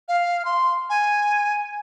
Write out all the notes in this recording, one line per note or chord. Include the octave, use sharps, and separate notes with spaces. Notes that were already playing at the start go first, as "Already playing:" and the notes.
F5
C6
G#5